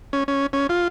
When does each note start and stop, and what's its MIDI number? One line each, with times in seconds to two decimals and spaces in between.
0.13 0.24 61
0.28 0.46 61
0.53 0.67 61
0.69 0.88 65